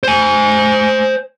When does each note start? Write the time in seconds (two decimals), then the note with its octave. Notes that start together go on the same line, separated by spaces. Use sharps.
0.03 C5 G#5